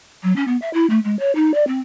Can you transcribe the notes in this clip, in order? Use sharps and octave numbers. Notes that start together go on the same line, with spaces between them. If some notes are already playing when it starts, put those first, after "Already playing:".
F#3
C#4
B3
E5
E4
A3
G#3
C#5
D#4
D5
C4